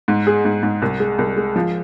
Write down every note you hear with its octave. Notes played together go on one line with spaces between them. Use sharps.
G#2
G#4
G#2
G#2
C2
G#3
C2
G#3
F3